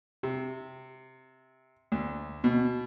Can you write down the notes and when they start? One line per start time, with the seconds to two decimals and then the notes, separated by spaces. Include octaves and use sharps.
0.23 C3
1.92 D2
2.44 B2